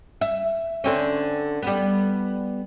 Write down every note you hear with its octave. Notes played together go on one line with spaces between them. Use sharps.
E5
D3 C4 C#4
G3 B3